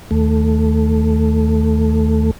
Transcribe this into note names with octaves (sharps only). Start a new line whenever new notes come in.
D#2 A3